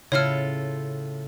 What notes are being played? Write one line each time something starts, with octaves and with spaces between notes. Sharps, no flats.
A2 C#3 F4 A4 C#5 F6